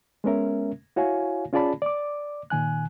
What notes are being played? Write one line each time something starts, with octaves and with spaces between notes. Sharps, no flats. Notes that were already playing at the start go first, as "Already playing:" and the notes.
G#3 B3 C#4 A#4 E5
E4 F#4 C#5 F5 G#5
C#4 F4 G#4 D5 A5 B5
D5 D6
A#2 D#3 G#5 F#6